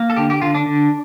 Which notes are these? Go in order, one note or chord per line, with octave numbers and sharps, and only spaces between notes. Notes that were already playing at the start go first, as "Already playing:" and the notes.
Already playing: A#3
A4
D3 G4
G4
D3 F4
D4
D3